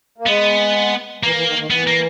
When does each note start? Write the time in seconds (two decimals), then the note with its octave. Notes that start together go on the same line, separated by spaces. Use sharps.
0.18 A#3
0.26 G#3 B3
1.23 E3 A#3
1.35 E3
1.47 D#3
1.58 D#3
1.70 E3 B3
1.87 A#3